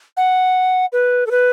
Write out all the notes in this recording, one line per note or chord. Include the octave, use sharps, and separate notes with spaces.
F#5
B4
A4
B4